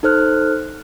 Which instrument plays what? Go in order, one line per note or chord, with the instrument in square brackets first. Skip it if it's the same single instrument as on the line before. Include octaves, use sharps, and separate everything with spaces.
[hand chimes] D#4 A4 C5 F6 F#6